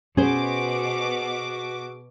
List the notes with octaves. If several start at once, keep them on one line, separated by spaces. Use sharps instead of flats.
B2 C#4 F#4 G#4 C5 D6